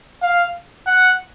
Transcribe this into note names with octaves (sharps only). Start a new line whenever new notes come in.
F5
F#5